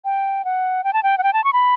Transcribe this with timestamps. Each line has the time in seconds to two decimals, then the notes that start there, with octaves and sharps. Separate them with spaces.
0.05 G5
0.45 F#5
0.84 G5
0.93 A5
1.03 G5
1.18 F#5
1.23 G5
1.33 A5
1.44 C#6
1.53 B5